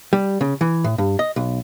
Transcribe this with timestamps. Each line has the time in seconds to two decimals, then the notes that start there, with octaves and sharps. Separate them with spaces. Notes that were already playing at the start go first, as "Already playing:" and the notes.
0.13 G3
0.41 C#3
0.61 E3
0.84 A2
0.98 G2
1.19 D#5
1.36 B1